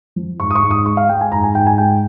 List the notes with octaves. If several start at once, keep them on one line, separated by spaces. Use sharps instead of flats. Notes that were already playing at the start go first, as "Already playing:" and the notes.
F3
G#2 C#6
D#6
C#6
G#2
D#6
G#3 C#6
F5
G#3 G5
G#5
G#2 A#5
G#5
G#2 G5
G#5
G#3 G5